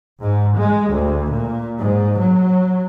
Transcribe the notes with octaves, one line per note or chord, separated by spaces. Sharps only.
G#2
G#3
D2
A#2
G#2
F#3